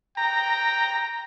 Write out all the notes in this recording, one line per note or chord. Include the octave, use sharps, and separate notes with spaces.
G5 A#5